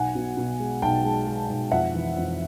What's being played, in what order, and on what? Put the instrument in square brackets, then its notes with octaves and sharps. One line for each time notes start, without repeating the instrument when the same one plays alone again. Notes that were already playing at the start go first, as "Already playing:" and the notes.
Already playing: [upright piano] B1 F#5 G#5
B2
B2
G#3
B1 G5 A5
G#3
G#3
B1
F2 E5 F#5
E3
F2